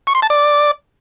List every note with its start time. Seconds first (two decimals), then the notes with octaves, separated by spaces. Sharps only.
0.07 C#6
0.15 C6
0.22 A5
0.30 D5